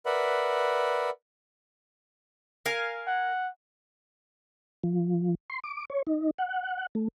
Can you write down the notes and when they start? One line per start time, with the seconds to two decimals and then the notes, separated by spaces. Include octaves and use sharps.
0.06 A#4 B4 D5 E5 F#5 B5
2.66 A#4 F5 G#5
3.07 F#5
4.84 F3
5.50 C6
5.64 D6
5.90 C#5
6.07 D#4
6.38 F#5
6.95 A3